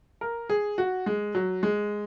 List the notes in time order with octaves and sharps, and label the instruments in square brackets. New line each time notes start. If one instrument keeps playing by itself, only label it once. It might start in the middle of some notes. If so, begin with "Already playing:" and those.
[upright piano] A#4
G#4
F#4
G#3
F#3
G#3